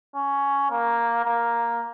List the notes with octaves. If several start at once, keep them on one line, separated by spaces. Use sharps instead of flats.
C#4
A#3
A#3